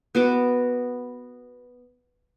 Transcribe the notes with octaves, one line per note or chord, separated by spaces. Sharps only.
B3 F#4 D6